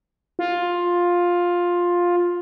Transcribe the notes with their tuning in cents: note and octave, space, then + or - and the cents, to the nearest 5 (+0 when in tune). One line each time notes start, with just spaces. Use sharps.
F4 +10